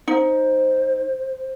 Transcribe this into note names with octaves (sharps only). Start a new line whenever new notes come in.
D#4 C5